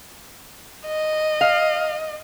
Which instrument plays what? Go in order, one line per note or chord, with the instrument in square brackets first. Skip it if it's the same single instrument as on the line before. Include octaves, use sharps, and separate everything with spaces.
[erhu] D#5
[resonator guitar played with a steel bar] F5